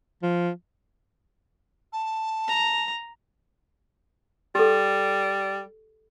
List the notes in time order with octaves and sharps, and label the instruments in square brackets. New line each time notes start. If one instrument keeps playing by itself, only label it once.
[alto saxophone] F3
[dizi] A5
[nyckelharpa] A#5
[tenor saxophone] G3 [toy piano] G4 A4